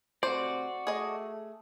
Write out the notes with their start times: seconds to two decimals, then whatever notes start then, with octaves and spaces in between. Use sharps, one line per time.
0.23 C3 A3 C4 F#4 C5 D5
0.87 A3 G#4 D#5